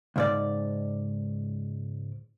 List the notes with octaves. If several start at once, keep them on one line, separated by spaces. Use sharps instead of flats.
C#2 G#2 D5